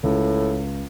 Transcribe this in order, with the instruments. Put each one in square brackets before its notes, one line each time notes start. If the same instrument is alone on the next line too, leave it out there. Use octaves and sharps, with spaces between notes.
[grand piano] C#2 [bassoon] A2